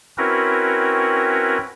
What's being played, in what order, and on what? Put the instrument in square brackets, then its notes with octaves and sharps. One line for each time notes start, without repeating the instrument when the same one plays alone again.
[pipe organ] C4 C#4 E4 F#4 A#4 B4